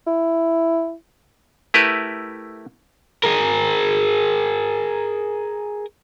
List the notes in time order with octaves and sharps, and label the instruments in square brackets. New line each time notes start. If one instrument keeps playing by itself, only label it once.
[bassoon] E4
[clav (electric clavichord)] A3 E4 G4 A#4 B4
[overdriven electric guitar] G#4 A#4